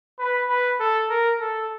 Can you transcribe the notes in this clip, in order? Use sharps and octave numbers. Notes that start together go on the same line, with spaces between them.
B4
B4
A4
A#4
A4